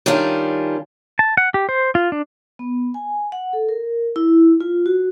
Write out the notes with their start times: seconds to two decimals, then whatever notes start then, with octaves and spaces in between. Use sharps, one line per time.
0.06 D#3 G3 C#4 D4 F4
1.19 A5
1.37 F#5
1.54 G4
1.69 C5
1.95 F4
2.12 D4
2.59 B3
2.94 G#5
3.32 F#5
3.53 A4
3.69 A#4
4.16 E4
4.61 F4
4.86 F#4